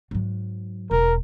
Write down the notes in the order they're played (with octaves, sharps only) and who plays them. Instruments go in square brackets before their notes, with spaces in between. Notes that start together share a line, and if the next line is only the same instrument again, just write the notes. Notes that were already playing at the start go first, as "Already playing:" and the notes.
[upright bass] G#2 F#3
[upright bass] E1 [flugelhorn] A#4